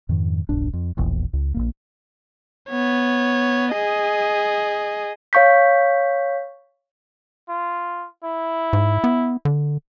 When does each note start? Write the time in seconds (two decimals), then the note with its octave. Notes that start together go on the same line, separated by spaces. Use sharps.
0.09 F2 G#2 D#3
0.49 D#1 B1 G2 D4
0.73 F2
0.97 E1 A#1 E2
1.33 C#2
1.54 A#1 F2 A#3
2.70 B3 C#5
3.73 G#4 D#5
5.33 C#5 F5 C#6 G6 B6
7.49 F4
8.24 E4
8.73 G#2
9.04 B3
9.45 D3